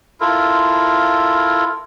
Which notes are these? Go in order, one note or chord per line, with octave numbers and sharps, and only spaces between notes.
E4 F4 A4 A#4